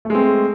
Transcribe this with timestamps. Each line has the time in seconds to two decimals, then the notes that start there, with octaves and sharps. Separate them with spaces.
0.05 A3
0.10 G#3
0.15 C4